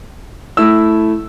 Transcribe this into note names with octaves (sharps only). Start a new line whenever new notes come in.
A3 E4 E6